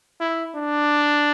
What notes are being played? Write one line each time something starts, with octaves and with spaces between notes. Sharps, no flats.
E4
D4